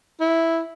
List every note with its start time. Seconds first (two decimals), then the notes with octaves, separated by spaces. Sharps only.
0.21 E4